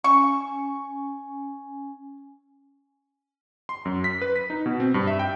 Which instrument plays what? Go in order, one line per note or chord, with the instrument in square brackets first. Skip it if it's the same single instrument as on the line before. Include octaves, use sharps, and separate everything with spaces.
[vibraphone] C#4 G#5 [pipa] C#6
[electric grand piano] C6
F#2
B6
B4
B6
D#4
B2
C4
G2
E5
G5